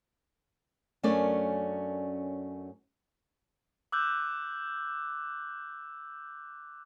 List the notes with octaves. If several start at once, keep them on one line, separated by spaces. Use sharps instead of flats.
F#2 A3 C#4 D4 A#4 D5
D6 E6 F#6 G6